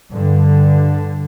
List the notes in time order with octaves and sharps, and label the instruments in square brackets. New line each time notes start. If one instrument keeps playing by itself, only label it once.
[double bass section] G2 D3